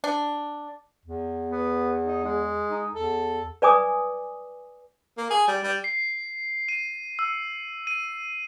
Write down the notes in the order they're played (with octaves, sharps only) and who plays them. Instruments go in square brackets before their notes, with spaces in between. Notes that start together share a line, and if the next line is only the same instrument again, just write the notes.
[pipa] D4
[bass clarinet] E2
[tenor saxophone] B3
D#4
G#3
[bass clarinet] D#4
[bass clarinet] E2 [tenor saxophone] A4
[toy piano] B4 D5 G#5 D6 D#6
[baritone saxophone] A#3
G#4
G3
G3
[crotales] C7
D#7
E6
D#7